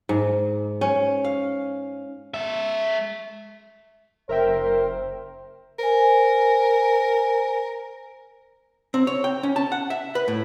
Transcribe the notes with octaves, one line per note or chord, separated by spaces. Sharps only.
G#2
C#4
F5
G#3 E5
F#1 A#4 C5 E5 G5
A#4 C5 G#5
C4
C#5
G5
C#4
A5
F#5
E5
B4
A2